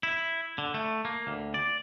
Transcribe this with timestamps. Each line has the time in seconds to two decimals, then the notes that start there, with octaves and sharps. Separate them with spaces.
0.03 E4
0.58 D3
0.74 A3
1.05 A#3
1.27 D2
1.54 D5